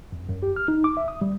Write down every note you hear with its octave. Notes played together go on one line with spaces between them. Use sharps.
F2
F#2
G4
F6
D#4
D6
E5
D#6
G3